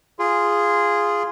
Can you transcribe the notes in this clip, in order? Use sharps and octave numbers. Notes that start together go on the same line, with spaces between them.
F4 G#4